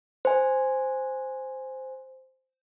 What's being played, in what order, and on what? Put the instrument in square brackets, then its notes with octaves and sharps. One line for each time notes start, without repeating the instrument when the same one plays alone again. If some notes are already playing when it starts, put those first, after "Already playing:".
[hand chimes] C5 G#5